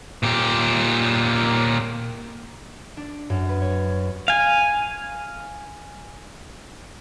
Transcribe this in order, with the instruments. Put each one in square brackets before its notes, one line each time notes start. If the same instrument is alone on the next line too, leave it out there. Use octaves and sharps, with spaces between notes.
[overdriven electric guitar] A#2 G4
[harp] D4
F#2
B4
C#5
[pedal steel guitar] F5 G#5